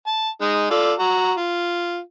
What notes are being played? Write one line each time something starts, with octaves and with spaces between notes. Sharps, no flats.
A5
G#3 D#4
F4 A4 D5
F#4 A#5
F4